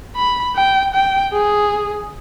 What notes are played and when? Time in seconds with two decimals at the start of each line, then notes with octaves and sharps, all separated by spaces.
0.16 B5
0.56 G5
0.94 G5
1.34 G#4